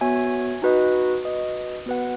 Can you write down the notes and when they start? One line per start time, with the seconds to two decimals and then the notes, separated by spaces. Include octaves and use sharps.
0.01 B3 F#4 C#5 E5 G#5
0.62 D#4 F#4 B4 D#5
1.24 F#4 B4 D#5
1.86 B3 F#4 B4 F#5